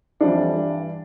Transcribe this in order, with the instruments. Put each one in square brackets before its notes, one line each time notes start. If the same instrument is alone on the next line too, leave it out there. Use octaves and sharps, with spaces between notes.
[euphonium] F2 [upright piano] E3 G3 D4
[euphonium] G2